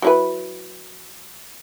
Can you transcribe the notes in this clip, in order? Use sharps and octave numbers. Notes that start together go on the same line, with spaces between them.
F#3 E4 B4